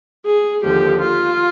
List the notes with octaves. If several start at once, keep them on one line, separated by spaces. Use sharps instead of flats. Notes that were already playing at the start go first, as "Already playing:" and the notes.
G#4
D#2 D3 F3 G4
F4